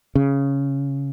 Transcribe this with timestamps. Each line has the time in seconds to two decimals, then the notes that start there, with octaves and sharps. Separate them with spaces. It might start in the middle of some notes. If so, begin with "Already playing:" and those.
0.15 C#3